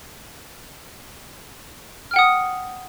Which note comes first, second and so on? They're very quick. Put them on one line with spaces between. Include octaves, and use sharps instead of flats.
F6 G5 F#5 D#6